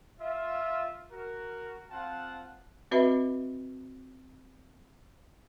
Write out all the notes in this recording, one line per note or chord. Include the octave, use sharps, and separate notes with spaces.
F4 E5
F#4 A#4
C4 F4 F5 F#5 A5
C4 F#4 B4 D#5 E5 B5